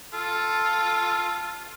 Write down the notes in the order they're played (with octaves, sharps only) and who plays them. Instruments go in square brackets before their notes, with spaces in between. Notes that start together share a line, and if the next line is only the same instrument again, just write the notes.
[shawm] F4 [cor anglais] A4